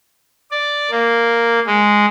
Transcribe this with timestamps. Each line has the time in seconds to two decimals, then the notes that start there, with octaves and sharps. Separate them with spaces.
0.51 D5
0.91 A#3
1.66 G#3